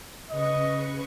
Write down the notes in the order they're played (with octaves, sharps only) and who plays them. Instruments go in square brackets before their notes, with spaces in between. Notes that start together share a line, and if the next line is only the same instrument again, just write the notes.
[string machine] C#3 B4 C#6 [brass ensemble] D#5